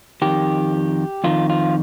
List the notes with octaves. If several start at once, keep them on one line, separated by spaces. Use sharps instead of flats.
F2 D#3 G4
F2 D#3 F4
F4